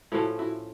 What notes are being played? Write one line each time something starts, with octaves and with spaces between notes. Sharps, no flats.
A2 F3 A3 C#4 E4 F#4
E4 F#4